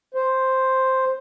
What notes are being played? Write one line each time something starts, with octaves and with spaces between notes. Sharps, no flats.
C5